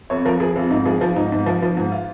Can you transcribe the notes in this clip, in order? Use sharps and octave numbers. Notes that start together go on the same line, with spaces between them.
F2 C#5
F3 A#4
F3 G#4
F2 F4
G#2 D#4
F3 G#4
F3 F4
G#2 D#4
G#2
F3
F3
G#2
F4